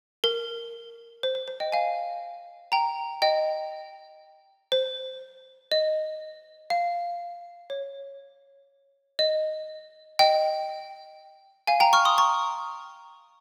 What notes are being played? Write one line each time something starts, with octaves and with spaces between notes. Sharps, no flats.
A#4
C5
C5
C5
D#5 G5
F5 G#5
G5 A#5
D#5 G5
C5
D#5
F5
C#5
D#5
D#5 G5
F5 G#5
G5 A#5
C#6 F6
C6 D#6
A#5 C#6